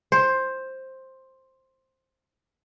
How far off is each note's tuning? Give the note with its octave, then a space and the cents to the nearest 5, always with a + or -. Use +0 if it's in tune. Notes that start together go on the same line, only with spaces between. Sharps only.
C5 +10